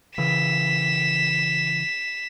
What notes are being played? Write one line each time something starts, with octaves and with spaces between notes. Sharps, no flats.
C#3 E3 B6 E7